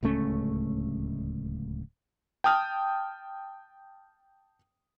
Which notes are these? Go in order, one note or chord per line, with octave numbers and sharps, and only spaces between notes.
D1 C#2 A3 C#4
G5 A5 D#6 F6